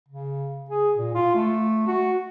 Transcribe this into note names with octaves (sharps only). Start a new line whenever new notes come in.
C#3
G#4
A#2
F4
A3
F#4